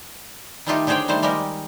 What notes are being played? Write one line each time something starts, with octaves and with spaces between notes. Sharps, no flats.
D#3 G3 A3 D#4 F4 G4
D3 G4 G#4 C5 C#5 G5
D#3 G3 A3 C5
G3 G#3 A#3 G4 A#4